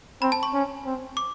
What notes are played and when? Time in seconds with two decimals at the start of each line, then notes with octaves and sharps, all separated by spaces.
0.22 C4 B5
0.32 A5
0.43 C#6
0.54 C#4
0.85 C4
1.17 D6